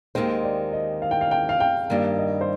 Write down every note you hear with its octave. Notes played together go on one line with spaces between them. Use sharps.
D#2 D#3 G#3 C4 C5
D5
D#5
F5
G5
F5
G5
F5
G5
G2 D#3 G3 A#3
D#5
C5